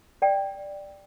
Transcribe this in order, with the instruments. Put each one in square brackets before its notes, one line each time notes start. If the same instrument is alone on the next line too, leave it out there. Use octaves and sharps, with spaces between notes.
[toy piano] D5 G5